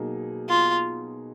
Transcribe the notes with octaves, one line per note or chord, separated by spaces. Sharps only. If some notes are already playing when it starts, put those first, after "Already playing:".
Already playing: B2 F#3 A#3 D#4 G#4
F4